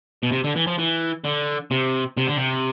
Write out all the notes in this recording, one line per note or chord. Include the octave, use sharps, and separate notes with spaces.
B2
C3
D3
E3
F3
E3
D3
C3
C3
D3
C3